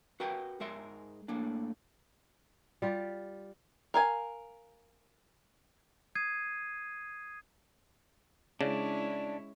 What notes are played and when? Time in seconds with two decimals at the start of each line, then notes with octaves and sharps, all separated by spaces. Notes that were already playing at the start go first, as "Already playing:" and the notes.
0.20 F#4 A#4 B4 G5
0.60 G#2 G#3 A#4 E5 C6
1.28 A2 A#3 D4
2.82 G3 F4 G4
3.94 A#4 F5 G#5
6.15 D#6 G#6 C7 D#7
8.61 C#3 G#3 C#4 D4 E4 D5